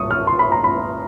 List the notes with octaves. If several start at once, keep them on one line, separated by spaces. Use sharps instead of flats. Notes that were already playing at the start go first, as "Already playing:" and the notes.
Already playing: C2 A#2 C#6 D#6
F6
C6
B5
A#5
B5